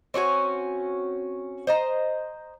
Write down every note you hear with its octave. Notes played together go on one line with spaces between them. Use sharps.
C4 C#4 F#4 G#5
C5 D#5 A#5